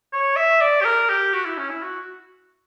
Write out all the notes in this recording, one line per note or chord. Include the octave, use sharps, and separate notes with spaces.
C#5
E5
D5
G4
A#4
G4
F#4
E4
C#4
E4
F#4